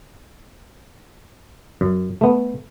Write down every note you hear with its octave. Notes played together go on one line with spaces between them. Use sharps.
F#2
A3 B3